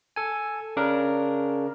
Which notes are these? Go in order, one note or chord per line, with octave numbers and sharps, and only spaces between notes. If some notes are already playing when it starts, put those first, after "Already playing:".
A4 G#5
C#3 D4 A#4